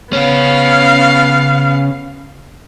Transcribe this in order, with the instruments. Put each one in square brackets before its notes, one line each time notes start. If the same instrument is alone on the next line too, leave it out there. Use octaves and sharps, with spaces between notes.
[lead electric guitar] C#3 C#4 [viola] B3 F5